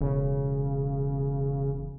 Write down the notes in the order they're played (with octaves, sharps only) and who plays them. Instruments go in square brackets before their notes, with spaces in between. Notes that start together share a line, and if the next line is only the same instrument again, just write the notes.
[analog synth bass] E1 [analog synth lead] C#3